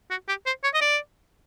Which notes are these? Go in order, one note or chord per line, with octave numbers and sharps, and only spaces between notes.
F#4
G4
C5
C#5
D#5
D5